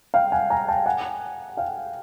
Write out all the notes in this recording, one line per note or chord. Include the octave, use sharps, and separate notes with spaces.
F5 G5
F#5 G#5
G#5 A#5
G5 A5
F#5 G#5
F5 G5